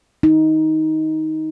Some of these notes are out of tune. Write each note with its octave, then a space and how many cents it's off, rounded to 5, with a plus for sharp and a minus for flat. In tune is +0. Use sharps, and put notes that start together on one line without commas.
D#4 +15